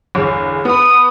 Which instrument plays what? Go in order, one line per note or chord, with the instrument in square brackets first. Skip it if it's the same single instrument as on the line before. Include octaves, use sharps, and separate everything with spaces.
[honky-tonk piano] G1 E2 G#4
[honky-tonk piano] B3 B5 [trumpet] D#6